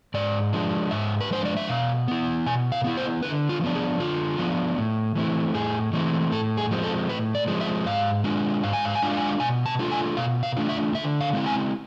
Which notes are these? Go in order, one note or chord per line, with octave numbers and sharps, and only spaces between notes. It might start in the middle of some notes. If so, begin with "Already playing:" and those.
G#2 D5
F3 G#3 D4
G#2 E5
B4
F3 G#3 D4 C5
D5
E5
B2 F5
B3 E4
B2 G#5
F5
B3 E4
C5
D3 B4
F4
F3 B3 D4
G#4
D3 F4
F3 B3 D4
A2
E3 A3 C4 E4
A2 G#4
E3 A3 C4 E4
A2 A4
G#4
F3 G#3 C4
A4
A2 B4
D5
F3 G#3 C4
E5
G#2 F5
G#3 D4 F4
G#2 F5
G#5
F5
G#5
G#3 D4 F4 F5
G#5
F5
B2 G#5
A5
A3 D4 F4
G#5
B2 F5
F5
A3 D4 F4
E5
D3 E5
F5
G#3 C4 E4
G#5